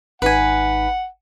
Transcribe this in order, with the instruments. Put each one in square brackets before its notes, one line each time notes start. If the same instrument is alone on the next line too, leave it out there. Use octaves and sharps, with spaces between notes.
[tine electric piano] G#1 D#4 B6 [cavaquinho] B4 G#5 [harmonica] F#5